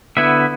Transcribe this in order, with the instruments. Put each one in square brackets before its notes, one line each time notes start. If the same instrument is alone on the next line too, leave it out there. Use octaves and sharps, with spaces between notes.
[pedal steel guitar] D3 B3 E4 E5